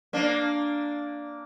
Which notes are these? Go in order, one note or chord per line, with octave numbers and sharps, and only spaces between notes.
A#3 D4